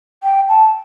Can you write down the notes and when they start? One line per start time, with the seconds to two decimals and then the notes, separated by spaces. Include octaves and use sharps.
0.23 G5
0.49 A5